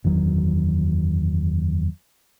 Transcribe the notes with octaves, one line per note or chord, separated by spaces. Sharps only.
F#1 E2 D#3 F#3